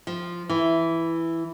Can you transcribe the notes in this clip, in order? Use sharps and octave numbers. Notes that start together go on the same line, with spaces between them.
F3
E3